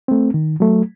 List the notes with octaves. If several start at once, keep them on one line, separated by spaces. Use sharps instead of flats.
A3 C4
D#3
F#3 A3